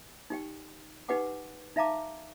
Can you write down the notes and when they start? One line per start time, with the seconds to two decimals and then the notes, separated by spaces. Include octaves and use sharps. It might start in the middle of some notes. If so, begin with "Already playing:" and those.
0.30 D#4 G4 G5
1.08 D#4 G4 B4 F#5 G#5 D6
1.76 D#4 E5 F5 A5 A#5 D6